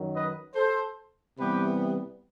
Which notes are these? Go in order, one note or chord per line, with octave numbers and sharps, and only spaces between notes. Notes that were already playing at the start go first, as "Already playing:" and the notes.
Already playing: F#2 D#3 F#3
B4 D#5
A4 C5
C3 E3 G3 B3 G4 B4